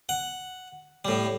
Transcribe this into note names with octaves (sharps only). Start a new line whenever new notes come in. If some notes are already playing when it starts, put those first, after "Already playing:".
F#5
A2 G3